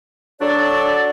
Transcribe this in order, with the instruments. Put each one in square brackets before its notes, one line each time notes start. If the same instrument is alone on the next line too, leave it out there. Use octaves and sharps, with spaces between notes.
[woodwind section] F#3 D4 A4 D5